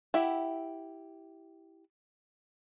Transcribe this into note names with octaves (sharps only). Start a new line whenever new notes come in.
E4 G4 E5 F#5